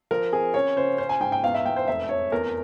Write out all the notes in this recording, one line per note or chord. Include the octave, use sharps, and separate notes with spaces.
F3 A#4
C4 G#4
C#4 C#5
C#3 C5
C#4 C5
G#5
G#2 G5
G5
E2 F5
E5
E1 G5
C5
F1 E5
F1 C#5
E2 A#4